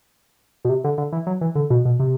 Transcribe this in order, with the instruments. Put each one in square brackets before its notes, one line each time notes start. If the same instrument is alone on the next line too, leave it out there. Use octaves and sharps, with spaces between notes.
[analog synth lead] B2
C3
D3
D3
E3
F#3
E3
D3
B2
B2
C3